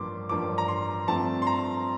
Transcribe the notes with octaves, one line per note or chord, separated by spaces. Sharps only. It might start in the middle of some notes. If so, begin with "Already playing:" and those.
Already playing: A1 G2 F3 A#3 C6 D6
A1 G2 F3 A#3 D6
A#5
C6
G2 F3 A3 C4 A5
C6
A#5